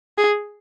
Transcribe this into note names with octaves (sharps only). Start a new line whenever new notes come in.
G#4